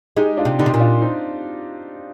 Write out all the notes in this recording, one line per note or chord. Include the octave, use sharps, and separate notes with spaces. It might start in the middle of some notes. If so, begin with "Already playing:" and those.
G#3 D#4 G4
D4 F4
C3
D3 D#4 G4
C3
A#2
D4 F4
C4 D#4